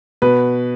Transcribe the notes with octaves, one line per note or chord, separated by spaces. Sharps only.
B2 B4